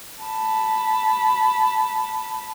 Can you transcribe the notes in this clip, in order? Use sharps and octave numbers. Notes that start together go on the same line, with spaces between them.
A5 B5